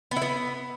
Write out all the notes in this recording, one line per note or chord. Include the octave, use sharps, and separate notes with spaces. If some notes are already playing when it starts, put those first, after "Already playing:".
B3
E4
B3